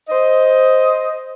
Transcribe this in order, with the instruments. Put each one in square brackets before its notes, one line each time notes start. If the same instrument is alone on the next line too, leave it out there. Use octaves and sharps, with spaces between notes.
[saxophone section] C5 D#5